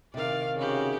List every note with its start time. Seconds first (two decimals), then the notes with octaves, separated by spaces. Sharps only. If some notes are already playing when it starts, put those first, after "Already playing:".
0.14 C3 D#3 D5 F5
0.56 C#3 F#4 G4